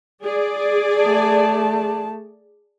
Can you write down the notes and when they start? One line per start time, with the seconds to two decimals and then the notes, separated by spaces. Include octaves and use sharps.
0.23 G#4 D5
0.99 A3 A5